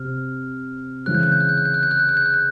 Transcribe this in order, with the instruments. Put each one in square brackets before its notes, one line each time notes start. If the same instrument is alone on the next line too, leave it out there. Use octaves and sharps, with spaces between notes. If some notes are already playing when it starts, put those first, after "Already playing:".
Already playing: [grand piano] C3 [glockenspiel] F6
[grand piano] C#3 E3 G#3 C4 [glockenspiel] F#6
[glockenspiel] G6
F#6
G6
F#6
G6
F#6
G6
F#6
G6
F#6
G6
F#6
G6
F#6
G6